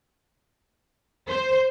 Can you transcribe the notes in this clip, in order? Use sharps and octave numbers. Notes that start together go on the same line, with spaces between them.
C5